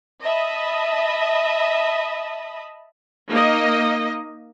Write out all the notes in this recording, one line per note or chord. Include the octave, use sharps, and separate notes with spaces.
D#5 E5 A5 B5 D#6
A#3 D#4 D#5